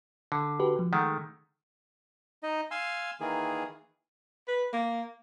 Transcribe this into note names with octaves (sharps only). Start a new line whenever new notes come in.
D3
F#4 G4 B4
F3
D#3 G#3 A3 F#5
D#4 D#5
F5 G#5 C6 E6
D#3 E3 A#3 G#4
B4
A#3